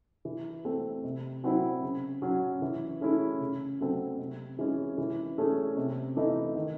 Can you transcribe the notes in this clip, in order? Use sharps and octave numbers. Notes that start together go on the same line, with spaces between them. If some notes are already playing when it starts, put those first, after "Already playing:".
E3
A3 C4
C3
F#3 C4 E4 C5
C#3
F#3 C#4
E3
A3 C#4 E4 G#4
C#3
F#3 A3 C4
C3
E3 G#3 C#4 G#4
E3
A3 C#4 G#4
C3
E3 A3 D#4
D#3